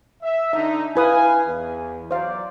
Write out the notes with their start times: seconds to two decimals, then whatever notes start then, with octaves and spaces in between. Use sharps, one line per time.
0.22 E5
0.53 D3 D#4 E5
0.96 E4 B4 F5 G#5 D#6
1.46 E2
2.11 F#3 C5 D5 F5